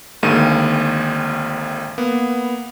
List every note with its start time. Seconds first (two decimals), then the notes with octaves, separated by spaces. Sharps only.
0.23 G#1 D2 D#3 G#3 A#3 D#7
1.98 A#3 B3